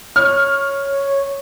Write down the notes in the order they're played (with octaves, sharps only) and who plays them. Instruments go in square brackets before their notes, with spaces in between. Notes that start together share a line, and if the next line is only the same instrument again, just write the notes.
[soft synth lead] C#5 [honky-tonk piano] F6